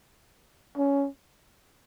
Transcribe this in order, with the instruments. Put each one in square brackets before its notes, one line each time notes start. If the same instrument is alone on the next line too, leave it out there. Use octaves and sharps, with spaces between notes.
[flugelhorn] C#4